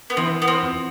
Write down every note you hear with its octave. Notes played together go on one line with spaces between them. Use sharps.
B3
E3 C4
B3
C4
F2